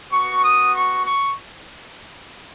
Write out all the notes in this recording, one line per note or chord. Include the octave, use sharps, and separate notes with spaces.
B3 F#4 C#6
D#6
C#6
C#6